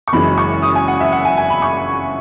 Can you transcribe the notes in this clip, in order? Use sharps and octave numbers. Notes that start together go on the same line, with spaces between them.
C#6
F#1 F#2 E3 G#3 B5
C#6
D#6
G#5
F#5
E5
F#5
G#5
G#5
B5
C#6